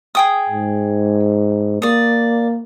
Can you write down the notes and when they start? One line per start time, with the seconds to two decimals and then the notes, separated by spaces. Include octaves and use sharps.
0.15 G#4 G5 D#6
0.50 G#2
1.82 A#3 D5 D#6